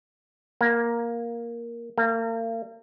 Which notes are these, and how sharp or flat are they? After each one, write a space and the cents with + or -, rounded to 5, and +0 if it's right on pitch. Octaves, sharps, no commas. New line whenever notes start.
A#3 +5
A#3 -40